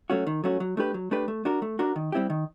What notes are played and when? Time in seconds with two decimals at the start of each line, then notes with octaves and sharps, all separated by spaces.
0.10 F#3 A3 C#4 F#4
0.27 D#3
0.44 F#3 A3 C#4 F#4
0.60 F#3
0.77 A3 D4 G4 B4
0.94 F#3
1.11 A3 D4 G4 B4
1.28 A3
1.45 D4 F#4 A#4
1.62 A3
1.79 D4 F#4 A#4
1.96 D#3
2.12 G3 C4 E4 G4
2.30 D#3